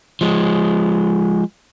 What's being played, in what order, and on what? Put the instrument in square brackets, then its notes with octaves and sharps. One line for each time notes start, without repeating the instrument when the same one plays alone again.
[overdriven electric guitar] F3 G#3